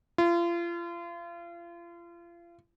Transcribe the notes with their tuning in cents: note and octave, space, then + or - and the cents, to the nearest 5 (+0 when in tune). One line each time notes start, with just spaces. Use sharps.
F4 -35